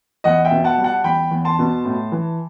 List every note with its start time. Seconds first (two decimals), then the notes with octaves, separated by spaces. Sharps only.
0.24 E2 D#5 F#5
0.45 E5 G5
0.51 B2
0.64 F#5 A5
0.78 G3
0.84 F#5 A5
1.04 E2 G5 B5
1.31 E2
1.45 A5 C6
1.59 B2
1.85 A2
2.12 E3